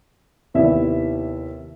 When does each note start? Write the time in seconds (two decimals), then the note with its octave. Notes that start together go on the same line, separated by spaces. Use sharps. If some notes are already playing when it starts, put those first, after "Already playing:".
0.54 D#2 C3 B3 E4 D5 E5